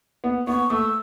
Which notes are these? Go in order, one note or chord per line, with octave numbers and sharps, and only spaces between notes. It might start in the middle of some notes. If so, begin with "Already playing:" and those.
B3
B3 C#6
A3 E6